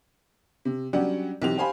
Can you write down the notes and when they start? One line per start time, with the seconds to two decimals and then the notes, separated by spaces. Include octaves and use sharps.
0.65 C3
0.93 F#3 G3 C#4 D4 G4 F#5
1.42 B1 E3 C4 G4 F7
1.58 G4 C5 F5 G#5 B5